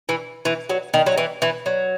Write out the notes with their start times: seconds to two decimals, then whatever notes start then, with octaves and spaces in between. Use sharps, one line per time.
0.09 E3
0.45 E3
0.69 F#3
0.94 D#3
1.06 F#3
1.18 E3
1.42 E3
1.66 F#3